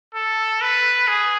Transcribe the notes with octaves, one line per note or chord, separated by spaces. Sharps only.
A4
B4
G#4